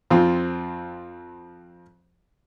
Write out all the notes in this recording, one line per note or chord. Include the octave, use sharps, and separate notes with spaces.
F2 C4 F4